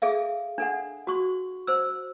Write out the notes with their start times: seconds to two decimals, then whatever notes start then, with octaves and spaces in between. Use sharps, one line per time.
0.02 G#4 A4 E5 F5
0.58 D4 A4 F#5
1.07 F#4 C#6
1.67 C5 E6